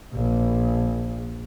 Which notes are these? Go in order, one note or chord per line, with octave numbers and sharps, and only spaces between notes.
A#1